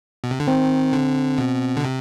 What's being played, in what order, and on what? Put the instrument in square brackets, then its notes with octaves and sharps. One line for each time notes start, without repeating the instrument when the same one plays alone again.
[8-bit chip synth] B2
C3
D3
[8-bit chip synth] D#3 [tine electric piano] C4
[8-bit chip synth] D3
B2
D3
C3